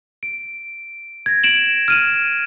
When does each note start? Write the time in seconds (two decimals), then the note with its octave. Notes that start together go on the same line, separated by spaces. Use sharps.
0.23 D7
1.26 G#6 A#6
1.44 D7 E7 F#7
1.88 F6 D#7 E7